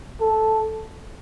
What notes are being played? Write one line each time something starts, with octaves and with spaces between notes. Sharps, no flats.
A4